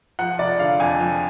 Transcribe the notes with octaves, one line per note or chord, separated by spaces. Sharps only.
F3 F#5
F1 D5
D3 F5
F2 G#5
F3